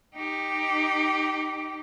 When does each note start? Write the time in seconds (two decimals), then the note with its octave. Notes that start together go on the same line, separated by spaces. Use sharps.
0.15 D#4 G4